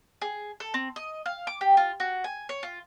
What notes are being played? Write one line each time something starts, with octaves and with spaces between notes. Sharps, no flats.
G#4
A4
C4
D#5
F5
D6
G4
F4
F#4
G#5
C#5
F4